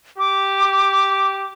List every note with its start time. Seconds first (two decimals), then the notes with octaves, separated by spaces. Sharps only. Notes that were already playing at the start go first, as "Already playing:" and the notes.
0.18 G4 D6